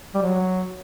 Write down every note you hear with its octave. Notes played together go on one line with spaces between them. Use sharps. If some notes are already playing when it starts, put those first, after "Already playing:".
G3
F#3